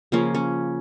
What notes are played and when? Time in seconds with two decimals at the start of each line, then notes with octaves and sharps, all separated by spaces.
0.12 C#3 F3 A#3 C#4
0.35 C#4